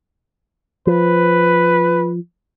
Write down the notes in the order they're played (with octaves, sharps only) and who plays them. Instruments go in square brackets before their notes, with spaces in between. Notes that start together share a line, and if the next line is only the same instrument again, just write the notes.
[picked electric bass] F3 [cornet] B4